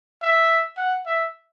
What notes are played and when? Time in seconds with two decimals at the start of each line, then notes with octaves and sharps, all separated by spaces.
0.22 E5
0.77 F#5
1.06 E5